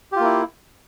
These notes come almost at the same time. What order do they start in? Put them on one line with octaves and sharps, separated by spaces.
G4 F4 A#3 E4